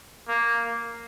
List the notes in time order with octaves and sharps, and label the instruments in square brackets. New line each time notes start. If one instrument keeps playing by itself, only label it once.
[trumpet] A#3